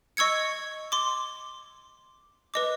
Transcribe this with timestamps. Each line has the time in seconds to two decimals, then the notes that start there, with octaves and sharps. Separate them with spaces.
0.17 D#5 C#6 E6 G#6 C#7
0.92 C6 D6
2.54 B4 D#5 D6